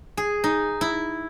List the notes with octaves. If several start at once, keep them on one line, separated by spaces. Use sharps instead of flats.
G#4
D#4
E4